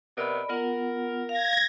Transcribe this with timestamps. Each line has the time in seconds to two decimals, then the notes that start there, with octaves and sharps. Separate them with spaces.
0.18 C3 B3 A#4 D5 D#5 B5
0.50 B3 F4 A#4 F#5
1.29 F5 G#6 A#6